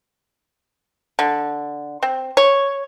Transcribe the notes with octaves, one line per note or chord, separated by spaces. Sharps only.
D3
C4
C#5